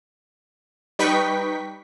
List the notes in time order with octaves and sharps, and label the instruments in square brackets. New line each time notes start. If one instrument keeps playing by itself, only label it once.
[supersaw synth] G3 D#4 B4 G5 C#6 B6